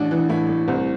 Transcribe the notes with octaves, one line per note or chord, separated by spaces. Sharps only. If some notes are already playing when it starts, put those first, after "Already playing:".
Already playing: A1 D4
E3
A2 E4
A2
C2 C4